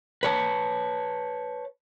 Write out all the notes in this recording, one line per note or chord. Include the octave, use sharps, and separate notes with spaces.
B4 C#5 A5